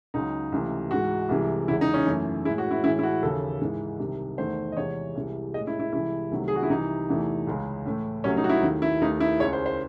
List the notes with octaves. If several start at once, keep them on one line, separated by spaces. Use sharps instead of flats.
C#2 C#3 F#3 D#4
C#2 C3 E3 A3
G#2 E3 G#3 F#4
C2 C3 E3 G#3
E2 C#3 G#3 E4
D#4
C#4
F#2 E3 A3
A2 G#3 E4
F#4
E4
A2 E3 G#3 E4
E4
F#4
D#2 C#3 E3 A4
G#2 E3 G#3
C2 C3 D#3
E2 D#3 A3 C5
D#5
E2 C3 E3 G#3 C#5
C2 C3 E3 G#3
A2 G#3 D#5
E4
E4
C2 C3 E3 G#3 E4
C2 C3 D#3 F#3 A3
G#4
F#4
E4
C2 C3 E3 D#4
E2 C3 E3 A3
C#2 C#3 G#3
A2 E3 A3
C2 C3 F#3 A3 C#4
D#4
F#4
E4
D#2 D#3 A3
E4
D#2 D#3 A3 D#4
E4
C#2 C#3 G#3 C#5
C5
C5